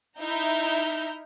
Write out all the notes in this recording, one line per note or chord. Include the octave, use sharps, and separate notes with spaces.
D#4 E4 E5 A#5 F6 G6